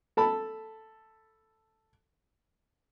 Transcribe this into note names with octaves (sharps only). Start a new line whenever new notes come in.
A4 A5 B5